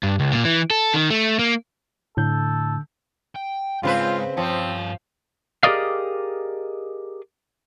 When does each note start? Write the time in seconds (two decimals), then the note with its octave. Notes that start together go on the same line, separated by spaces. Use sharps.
0.03 G2
0.20 C#2
0.33 A#2
0.45 E3
0.70 A4
0.94 D#3
1.10 A3
1.39 A#3
2.17 A2 D3 A4 G6
3.36 G5
3.83 G#2 C#3 C4 F4 B4
4.37 G2 F3 C4 C#5
5.63 G4 G#4 A#4 D5 D#5 F5